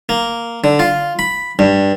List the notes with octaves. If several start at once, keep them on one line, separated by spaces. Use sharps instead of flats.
A#3
D3
F4
B5
G2